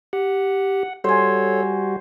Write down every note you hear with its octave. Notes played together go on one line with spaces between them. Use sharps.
G4 F#5
G3 F#4 A4 C5 C#5 G#5